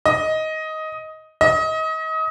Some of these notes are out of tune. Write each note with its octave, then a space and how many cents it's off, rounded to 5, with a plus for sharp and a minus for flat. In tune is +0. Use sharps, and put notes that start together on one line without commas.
D#5 +10
D#5 +30